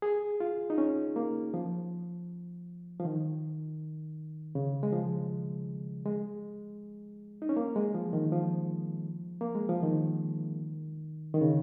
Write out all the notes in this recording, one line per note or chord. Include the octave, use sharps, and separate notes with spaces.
G#4
F4
D#4
C#4
A#3
F3
F3
D#3
C#3
G#3
F3
G#3
D#4
C#4
A#3
G#3
F3
D#3
F3
A#3
G#3
F3
D#3
D#3
C#3